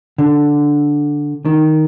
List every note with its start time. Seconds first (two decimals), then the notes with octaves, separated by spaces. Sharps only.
0.18 D3
1.45 D#3